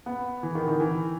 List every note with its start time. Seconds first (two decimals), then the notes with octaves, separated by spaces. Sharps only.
0.06 B3
0.43 E3
0.55 D#3
0.68 D#3
0.80 E3